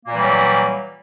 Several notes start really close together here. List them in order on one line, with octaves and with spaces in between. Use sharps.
A#3 A#2 E3 G3 F#3